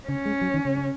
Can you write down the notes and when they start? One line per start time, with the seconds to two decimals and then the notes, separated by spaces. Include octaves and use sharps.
0.08 C#3 C#4
0.25 G#3
0.41 F#3
0.54 D#3
0.65 C#3